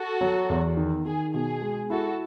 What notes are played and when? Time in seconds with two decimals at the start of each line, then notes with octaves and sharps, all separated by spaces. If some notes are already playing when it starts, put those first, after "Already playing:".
Already playing: F#4 A4
0.21 F#3
0.50 E2
0.77 D#3
1.05 D#3 G#4
1.34 B2 G#4
1.62 G#3
1.90 E4 F#4 A4